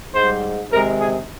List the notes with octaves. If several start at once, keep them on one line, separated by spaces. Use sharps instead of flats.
G#2 G3 C5
C3 D#3 G#3 A#4
G#4